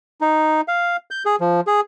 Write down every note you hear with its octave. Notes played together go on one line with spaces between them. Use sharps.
D#4
F5
G6
G#4
F3
G#4